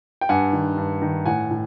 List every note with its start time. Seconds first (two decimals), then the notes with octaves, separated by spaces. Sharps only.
0.21 G5
0.29 G2 F#5 G#5
0.53 D#3
0.77 G2
1.02 D#3
1.25 A2 F#5 G#5
1.51 A2